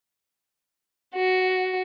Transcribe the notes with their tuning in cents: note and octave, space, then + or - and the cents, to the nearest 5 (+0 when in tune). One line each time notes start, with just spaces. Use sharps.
F#4 +5